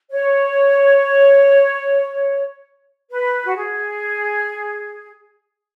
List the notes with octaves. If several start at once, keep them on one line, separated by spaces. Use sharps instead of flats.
C#5
B4
F#4
G#4